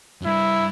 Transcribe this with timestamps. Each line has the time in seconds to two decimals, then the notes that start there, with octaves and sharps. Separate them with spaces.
0.22 F#2
0.25 G2 E4